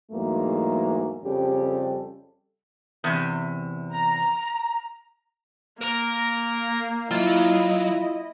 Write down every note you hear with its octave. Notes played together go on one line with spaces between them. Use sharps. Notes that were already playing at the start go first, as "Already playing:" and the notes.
E2 G#2 F#3 A3 A#3
F2 C#3 G3 G4 A4
E2 C3
A#5
A#3 A#4 A#5
F#3 E4 F4 D#5